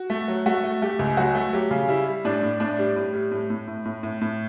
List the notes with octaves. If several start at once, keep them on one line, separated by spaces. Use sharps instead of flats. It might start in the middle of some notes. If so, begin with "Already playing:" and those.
Already playing: F#4
A3
F#3
A3 F#4
A3
A3 G4
C#2
F#3 F#4
A3
F#3 G4
C#3
G3 E4
G3
A2 D4
A2
A2 D4
G3
A2
G3
A2
A2
A2
A2
A2
A2